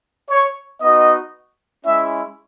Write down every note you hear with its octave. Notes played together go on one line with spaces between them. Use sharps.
C#5
B3 D#4 F#4 D#5
G#3 C#4 E4 E5